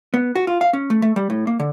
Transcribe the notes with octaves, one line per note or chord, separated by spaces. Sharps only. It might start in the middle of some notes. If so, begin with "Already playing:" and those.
B3
F#4
F4
F5
C#4
A3
A3
G3
A2
A#3
D3